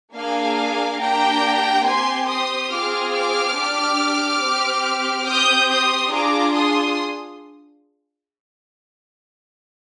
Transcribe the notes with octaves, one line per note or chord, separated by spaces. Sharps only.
A#3 D4 G#4 F5 G#5
A#3 D4 G4 G5 A#5
C4 G4 G#5 C6
C6 D#6
C4 F4 G#4 D6 F6
D6 F6
D4 G4
C4 G4
C4 G4 D#6 G6
C6 D#6
D4 F4 G#4 A#5 D6
C6 D#6